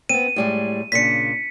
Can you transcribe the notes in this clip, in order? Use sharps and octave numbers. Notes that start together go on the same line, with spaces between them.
B3 C4 D#7
A2 G3 G#3
A#2 C#3 D4 B6 C#7